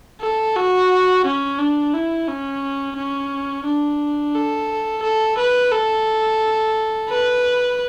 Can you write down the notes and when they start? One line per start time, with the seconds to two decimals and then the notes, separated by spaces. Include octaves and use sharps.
0.21 A4
0.56 F#4
1.25 C#4
1.59 D4
1.93 E4
2.28 C#4
2.97 C#4
3.65 D4
4.35 A4
5.03 A4
5.38 B4
5.72 A4
7.09 B4